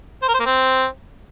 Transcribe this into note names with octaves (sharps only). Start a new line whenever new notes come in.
C5
A#4
C5
A#3
C4